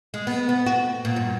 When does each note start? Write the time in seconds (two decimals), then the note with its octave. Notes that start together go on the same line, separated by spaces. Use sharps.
0.14 G#3
0.27 B3
0.49 B3
0.66 F#4
1.05 A#2
1.16 G2